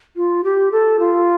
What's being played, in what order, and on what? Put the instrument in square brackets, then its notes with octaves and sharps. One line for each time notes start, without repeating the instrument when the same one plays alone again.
[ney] F4
G4
A4
F4